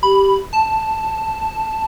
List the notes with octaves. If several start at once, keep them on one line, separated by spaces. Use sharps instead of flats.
G4 B5
A5